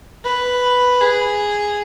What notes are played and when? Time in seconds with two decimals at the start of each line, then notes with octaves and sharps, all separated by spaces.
0.24 B4
1.01 G#4